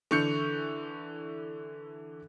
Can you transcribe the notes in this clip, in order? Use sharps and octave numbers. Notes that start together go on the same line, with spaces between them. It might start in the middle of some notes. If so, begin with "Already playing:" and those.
D3 E3 C#6 G6 C#7